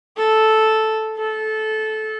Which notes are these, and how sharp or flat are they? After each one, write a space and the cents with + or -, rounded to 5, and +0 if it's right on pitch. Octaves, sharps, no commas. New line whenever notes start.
A4 -5
A4 -20